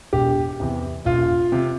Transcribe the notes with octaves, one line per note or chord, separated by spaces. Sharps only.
E1 G4
E2 C3
E1 F4
C3